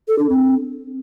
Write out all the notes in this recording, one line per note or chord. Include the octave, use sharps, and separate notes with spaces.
A4
D4
C4